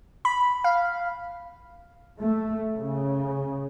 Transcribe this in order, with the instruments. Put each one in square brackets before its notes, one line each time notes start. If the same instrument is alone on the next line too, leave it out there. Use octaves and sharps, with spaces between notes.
[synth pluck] B5
F5
[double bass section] A3
C#3